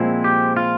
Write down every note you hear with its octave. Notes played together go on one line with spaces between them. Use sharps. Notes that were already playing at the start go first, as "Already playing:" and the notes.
Already playing: A#2 F3 G#3 C4 E4
G4
F4